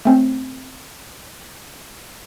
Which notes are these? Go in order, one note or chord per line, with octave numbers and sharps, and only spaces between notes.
A3 C4 C#4